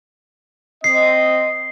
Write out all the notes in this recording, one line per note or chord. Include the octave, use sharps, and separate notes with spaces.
C4 D#5 C7